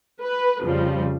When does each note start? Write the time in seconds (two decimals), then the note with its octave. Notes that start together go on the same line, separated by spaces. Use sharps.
0.21 B4
0.61 F2 C#3 F3 G3